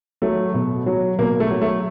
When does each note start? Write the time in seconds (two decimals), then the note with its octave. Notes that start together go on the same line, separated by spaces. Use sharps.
0.22 F#3 A3
0.54 B2
0.86 F#3
1.18 B2 A#3
1.40 A3
1.51 F#3
1.62 A3